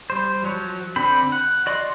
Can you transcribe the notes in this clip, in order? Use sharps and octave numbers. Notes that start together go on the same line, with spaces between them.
G3 C5
F3 F#3 C#5
D3 C4 G5 B5
F#5
F#4 D5 D#5 C6 C#6